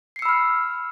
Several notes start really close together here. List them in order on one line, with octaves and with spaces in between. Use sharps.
C7 C#7 E6 B5 F6